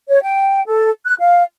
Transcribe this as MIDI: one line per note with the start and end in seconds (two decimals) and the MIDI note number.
0.08 0.20 73
0.22 0.61 79
0.66 0.89 69
1.05 1.15 90
1.19 1.42 77